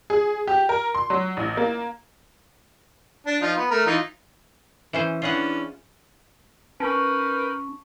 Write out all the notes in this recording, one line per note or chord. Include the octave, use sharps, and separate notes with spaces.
G#4
G4
A#4
C6
F#3
A1
A#3
D4
F3 D#4 F4
B3
A3 A#4
E3 D#4 F4
E3 C#4 C5
E3 C#4 D4 F4 G#4 F#5
C#4 D#4 A#4 B4 A5 C#6